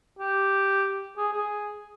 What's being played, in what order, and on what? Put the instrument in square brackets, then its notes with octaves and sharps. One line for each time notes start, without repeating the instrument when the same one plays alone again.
[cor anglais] G4
G#4
G#4